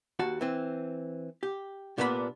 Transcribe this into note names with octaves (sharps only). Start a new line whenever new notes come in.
D#2 F#4 A5
E3 C4
G4
C2 A#2 B3 D4 F#4 B5